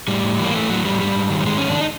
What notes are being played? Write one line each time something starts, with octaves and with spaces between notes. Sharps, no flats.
A2 G3
A2
E3 A#3
E3 A3
A2 F#3
A2 G3
G#2 G3
G#2
D#3
G3
D#3 G#3
G#2 C#4
D4
D#4